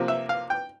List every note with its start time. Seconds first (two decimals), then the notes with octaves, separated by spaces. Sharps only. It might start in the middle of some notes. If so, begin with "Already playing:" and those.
Already playing: C3 F3 A#3
0.08 E5
0.29 F5
0.50 G5